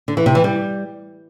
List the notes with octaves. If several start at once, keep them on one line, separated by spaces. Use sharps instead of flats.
D3
E3
C3
E3
G3